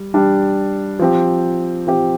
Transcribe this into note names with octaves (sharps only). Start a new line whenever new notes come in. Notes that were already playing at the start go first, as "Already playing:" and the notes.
Already playing: G3
G3 D4 G4
F3 C4 G4
F3 C4 G4